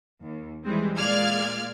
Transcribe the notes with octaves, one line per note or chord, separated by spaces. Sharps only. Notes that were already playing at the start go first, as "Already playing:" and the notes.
D#2
E3 G3 G#3 C4
A#2 G#3 D5 F5 F6 G#6